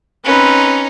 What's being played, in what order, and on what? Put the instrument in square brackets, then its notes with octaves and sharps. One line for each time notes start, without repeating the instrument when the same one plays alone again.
[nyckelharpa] C4 B4 [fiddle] C#4 D#4